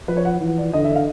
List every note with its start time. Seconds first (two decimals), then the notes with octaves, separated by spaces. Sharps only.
0.08 F3 B4
0.17 C#5
0.25 F#5
0.41 E3
0.57 D5
0.73 D3 D#5
0.84 E5
0.96 F5